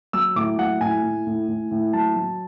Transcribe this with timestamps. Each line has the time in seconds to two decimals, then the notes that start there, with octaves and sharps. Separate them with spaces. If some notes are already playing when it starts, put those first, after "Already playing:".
0.13 F#3 E6
0.36 A2 D6
0.58 F#3 F#5
0.81 A2 G#5
1.03 A2
1.27 A2
1.48 A2
1.71 A2
1.93 F#3 A5
2.16 F#3